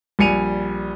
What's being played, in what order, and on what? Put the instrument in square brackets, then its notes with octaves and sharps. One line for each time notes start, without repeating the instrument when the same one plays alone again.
[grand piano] A#1 G3 G#5 C#7 D#7 F7